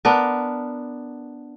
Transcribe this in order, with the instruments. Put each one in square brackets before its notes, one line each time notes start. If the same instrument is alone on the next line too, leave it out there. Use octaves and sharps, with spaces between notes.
[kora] B3 D4 A#4